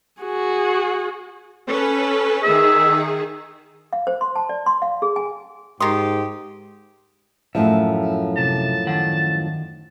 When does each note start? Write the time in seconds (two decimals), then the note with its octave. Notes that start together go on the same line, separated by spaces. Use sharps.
0.22 F#4 G#4
1.68 C#4 A4 B4
2.43 D#3 G#4 E5
3.93 F5
4.07 C5
4.21 C6
4.36 A5
4.49 D5
4.66 C6
4.82 F5
5.02 G#4
5.16 G#5
5.80 G#2 D#3 G4 C6 D#6
7.55 F#2 A2 F3 E5
8.37 C3 A5
8.87 D#3 F#5